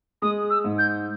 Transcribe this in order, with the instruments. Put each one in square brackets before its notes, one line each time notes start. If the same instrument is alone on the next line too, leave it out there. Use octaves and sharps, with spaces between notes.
[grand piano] G#3 [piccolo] D#6
[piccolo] E6
[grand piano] G#2
[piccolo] G6